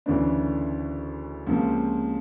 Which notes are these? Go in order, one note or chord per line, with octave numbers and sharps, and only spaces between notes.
D2 C#3 E3 A3 D4
C#2 C3 F3 A#3